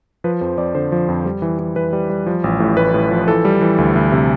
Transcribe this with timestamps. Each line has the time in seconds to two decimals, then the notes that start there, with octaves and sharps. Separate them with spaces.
0.24 F3 B4
0.41 F2 C5
0.58 F2 D5
0.75 D3 C5
0.92 F3
1.09 F2
1.25 G3
1.42 E3
1.59 E3
1.76 E3 B4
1.93 G3
2.10 G3
2.27 F3
2.44 A1
2.60 A2
2.77 A1 B4
2.94 A2
3.11 F3
3.28 E3 A4
3.45 G3
3.61 E3
3.78 D2
3.96 D2
4.12 C3